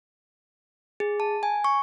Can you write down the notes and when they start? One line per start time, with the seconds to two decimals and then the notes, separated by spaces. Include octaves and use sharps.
1.00 G#4
1.20 A5
1.43 G#5
1.64 C#6